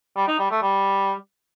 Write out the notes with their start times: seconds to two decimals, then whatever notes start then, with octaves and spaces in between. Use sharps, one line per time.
0.16 G3
0.28 D#4
0.39 G3
0.51 A3
0.62 G3